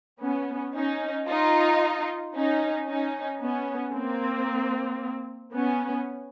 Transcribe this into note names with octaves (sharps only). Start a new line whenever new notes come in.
B3 C#4
C#4 D#4
D#4 F4
C#4 D#4
C#4 D#4
B3 C#4
A#3 C4
B3 C#4